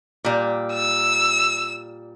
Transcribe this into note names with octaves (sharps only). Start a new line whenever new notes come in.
A#2 G3
E6